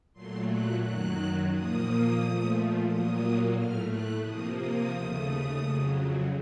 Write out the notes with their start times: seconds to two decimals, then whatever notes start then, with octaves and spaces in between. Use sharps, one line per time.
0.13 A#2 F#3 A3 C6
0.48 F#6
0.81 F#2 D#3 F#3 F#6
1.50 A#2 F3 A#3 D#6
2.18 A#2 F3 A3
2.86 A#2 F#3 A#3 D#6
3.54 A2 A3 F6
3.88 F#6
4.22 C3 F3 A#3 D#6
4.56 D#6
4.90 D#2 C#3 A3
5.59 F2 C#3 F#3